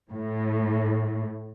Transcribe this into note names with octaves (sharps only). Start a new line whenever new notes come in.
A2